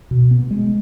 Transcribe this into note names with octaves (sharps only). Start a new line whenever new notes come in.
B2
B3
G#3